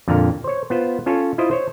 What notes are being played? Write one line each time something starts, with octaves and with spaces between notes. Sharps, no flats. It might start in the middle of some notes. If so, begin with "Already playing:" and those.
F2 A#2 D3 F5 A#5
C5 C#5
B3 F4 C5
C#4 F4 A4 C#5
E4 F4 C5 D#5
C5 C#5